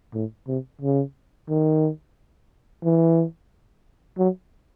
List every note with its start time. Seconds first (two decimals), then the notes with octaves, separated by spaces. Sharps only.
0.14 A2
0.48 C3
0.82 C#3
1.49 D#3
2.84 E3
4.18 F#3